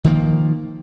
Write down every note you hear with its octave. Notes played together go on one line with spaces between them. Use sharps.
D#3 F3 A#3